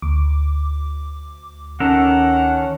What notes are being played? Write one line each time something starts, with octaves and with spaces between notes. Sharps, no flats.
D2 D6
D#3 C#4 A4 A#4 F#5